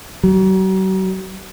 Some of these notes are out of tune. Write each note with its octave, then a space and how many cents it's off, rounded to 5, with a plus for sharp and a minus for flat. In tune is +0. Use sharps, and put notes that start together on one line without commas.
F#3 +40